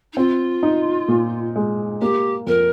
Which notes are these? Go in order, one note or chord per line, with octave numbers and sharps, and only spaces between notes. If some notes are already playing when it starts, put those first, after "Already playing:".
D#4
C4 F4
D#4
A#2
G#3
A#3 G4
F2 A#4